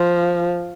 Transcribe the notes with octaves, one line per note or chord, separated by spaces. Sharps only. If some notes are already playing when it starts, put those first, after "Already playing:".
Already playing: F3